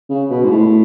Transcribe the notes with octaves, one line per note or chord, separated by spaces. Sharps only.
C#3
B2
G#2
A2